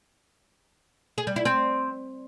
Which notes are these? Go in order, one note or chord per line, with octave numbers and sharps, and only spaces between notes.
G#4
G3
E4
C4